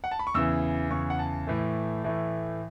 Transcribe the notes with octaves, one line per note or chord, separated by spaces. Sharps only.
F#5
A5
B5
C#6
E2 C#3 E3 E6
E2 C#3 E3 C#6
F#5
A5
A2 E3 A3
A2 E3 A3